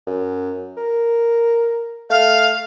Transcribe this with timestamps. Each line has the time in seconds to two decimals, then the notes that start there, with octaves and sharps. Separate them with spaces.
0.07 F#2
0.77 A#4
2.10 A3 F5